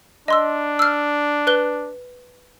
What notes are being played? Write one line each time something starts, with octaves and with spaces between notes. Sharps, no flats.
D4 D#5 C6 E6
E6 F6
B4 F#6 G7